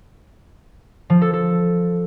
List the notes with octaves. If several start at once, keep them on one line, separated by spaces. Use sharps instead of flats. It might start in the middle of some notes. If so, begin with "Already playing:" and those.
F3
A4
A4